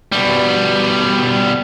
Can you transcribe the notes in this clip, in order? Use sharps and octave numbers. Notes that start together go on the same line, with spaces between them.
B2 G3